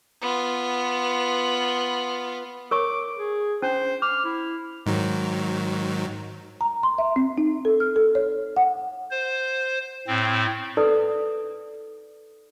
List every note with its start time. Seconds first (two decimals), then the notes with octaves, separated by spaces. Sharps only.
0.22 B3 F4
2.71 A#4 C#5 C#6 D6
3.16 G#4
3.62 C#4 D4 C5
4.02 D6 F6
4.25 E4
4.86 G#2 D#3 F#3
6.61 A#5
6.83 C6
6.98 E5
7.16 C4
7.38 D#4
7.65 A4
7.80 F6
7.96 A4
8.15 C#5
8.57 F#5
9.11 C5
10.07 A2 C4
10.77 D#4 A4 B4 D5 D#6